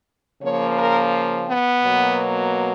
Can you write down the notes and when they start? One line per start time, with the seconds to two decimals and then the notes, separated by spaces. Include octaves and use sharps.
0.41 C#3 F3 A#3 C#5
0.76 A#4
1.47 B3
1.82 B2 F#3 A#3